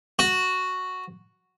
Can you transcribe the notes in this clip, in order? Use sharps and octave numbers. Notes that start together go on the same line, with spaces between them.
F#4